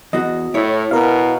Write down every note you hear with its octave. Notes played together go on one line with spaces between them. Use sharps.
E2 F#4 D#5
A2 E4 C#5
B2 A#4 F5